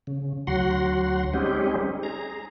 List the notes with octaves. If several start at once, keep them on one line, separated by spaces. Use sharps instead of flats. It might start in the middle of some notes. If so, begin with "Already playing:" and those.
C#3
D2 F#3 F#4 F#5 C6
G3 G#3 C4 C#4 D#4 G4
G#4 A#5